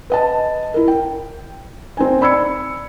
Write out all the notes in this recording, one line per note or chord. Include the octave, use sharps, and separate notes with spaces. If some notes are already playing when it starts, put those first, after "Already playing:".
B4 D#5 A5
E4 A#4
G5
C4 D#4 G#5
D5 B5 E6 G#6 C#7